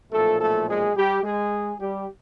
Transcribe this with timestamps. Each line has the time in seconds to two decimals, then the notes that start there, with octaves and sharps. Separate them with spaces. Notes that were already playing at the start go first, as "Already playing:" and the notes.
0.11 B1 A#2 F3 A3 A4
0.40 A3 A4
0.68 G#3 G#4
0.96 G3 G4
1.24 G#3 G#4
1.80 G3 G4